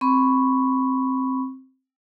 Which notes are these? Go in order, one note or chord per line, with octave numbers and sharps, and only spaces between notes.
C4 B5 C#6